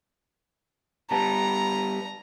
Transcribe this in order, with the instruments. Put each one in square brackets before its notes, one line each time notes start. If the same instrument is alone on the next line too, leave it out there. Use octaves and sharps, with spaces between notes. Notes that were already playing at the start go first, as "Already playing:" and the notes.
[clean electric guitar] G3 B3 [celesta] A5 [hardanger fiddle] A#5